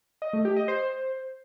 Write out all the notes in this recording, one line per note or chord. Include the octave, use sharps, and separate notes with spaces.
D#5
A3
G4
D#5
C5